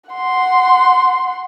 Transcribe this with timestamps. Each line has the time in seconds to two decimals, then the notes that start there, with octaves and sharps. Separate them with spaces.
0.10 F#5 C6